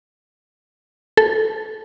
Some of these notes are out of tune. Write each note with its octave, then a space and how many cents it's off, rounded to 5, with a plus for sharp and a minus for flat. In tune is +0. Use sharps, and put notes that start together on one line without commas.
A4 -10